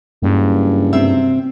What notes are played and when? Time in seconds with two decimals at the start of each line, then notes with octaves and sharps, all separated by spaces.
0.22 F#1 G2
0.93 C3 C4 E5